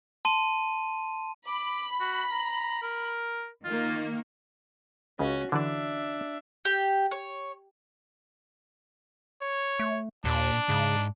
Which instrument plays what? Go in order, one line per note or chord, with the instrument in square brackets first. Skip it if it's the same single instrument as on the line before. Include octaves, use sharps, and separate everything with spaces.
[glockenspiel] A5 C6 D#7
[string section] B5 [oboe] D6
[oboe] F#4
A#5
A#4
[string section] D#3 A#3 [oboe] F4
[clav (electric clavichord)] C#2 C#3 [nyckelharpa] C#4 F#4
[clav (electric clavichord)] D3 E3 D5 [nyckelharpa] D4 E5
[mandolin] G4
C#5
[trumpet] C#5
[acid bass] A3
[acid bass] D#2 [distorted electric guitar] A#2 [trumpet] D4
[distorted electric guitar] G#2 [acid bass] C#3